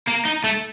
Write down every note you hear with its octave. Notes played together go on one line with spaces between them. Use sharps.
A#3
D#4
A3